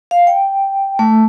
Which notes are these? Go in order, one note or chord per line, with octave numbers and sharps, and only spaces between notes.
F5
G5
A3